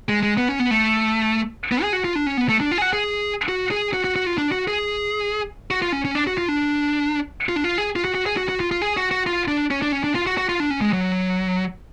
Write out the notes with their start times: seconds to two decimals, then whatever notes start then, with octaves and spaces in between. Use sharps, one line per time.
0.09 G#3
0.23 G#3
0.37 B3
0.49 C#4
0.60 B3
0.71 A3
1.72 B3
1.82 G#4
1.93 F#4
2.04 F4
2.15 D4
2.26 C#4
2.37 B3
2.49 A3
2.60 D4
2.72 F4
2.78 G#4
2.82 F#4
2.93 G#4
3.49 F#4
3.71 G#4
3.94 F#4
4.04 F#4
4.16 F#4
4.26 F4
4.38 D4
4.52 F#4
4.68 G#4
5.71 F#4
5.82 F4
5.92 C#4
6.05 C#4
6.15 D4
6.27 F#4
6.38 F4
6.48 D4
7.49 F4
7.56 D4
7.64 F4
7.78 G#4
7.96 F4
8.05 F#4
8.15 F#4
8.26 G#4
8.37 F#4
8.49 F#4
8.60 F4
8.71 F4
8.82 G#4
8.97 F#4
9.11 F#4
9.26 F4
9.48 D4
9.71 C#4
9.82 D4
9.92 C#4
10.04 D4
10.15 F4
10.27 F#4
10.38 F#4
10.49 F4
10.60 D4
10.70 C#4
10.81 G#3
10.93 F#3